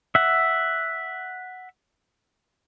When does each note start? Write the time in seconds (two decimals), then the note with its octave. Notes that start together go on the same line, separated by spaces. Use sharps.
0.15 E5 F#5